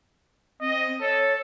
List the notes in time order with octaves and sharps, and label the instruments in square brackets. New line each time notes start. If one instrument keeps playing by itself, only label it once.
[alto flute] C4 [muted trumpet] D#5
[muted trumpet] A4 [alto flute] C#5